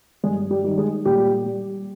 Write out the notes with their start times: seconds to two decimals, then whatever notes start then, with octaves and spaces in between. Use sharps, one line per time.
0.24 G2 G#3 G#4
0.51 G3 G4
0.64 D#3 G3
0.78 G#3 G#4
1.05 A#2 G3 G4
1.46 G3